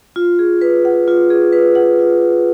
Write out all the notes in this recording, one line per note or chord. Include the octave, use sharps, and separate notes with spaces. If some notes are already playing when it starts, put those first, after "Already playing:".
F4
G#4
B4
F#5
F4
G#4
B4
F#5
F4
G#4